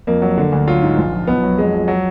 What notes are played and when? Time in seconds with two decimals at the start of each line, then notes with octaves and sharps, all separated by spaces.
0.07 F2 A#3
0.22 F#3
0.38 D3
0.52 D2
0.68 F#3 F4
0.82 G#2
0.98 A#1
1.13 F3
1.27 B1 B3
1.43 F#3
1.58 F2 G#3
1.73 F3
1.88 F#3